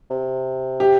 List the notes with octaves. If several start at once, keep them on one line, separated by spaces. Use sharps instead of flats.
C3
G4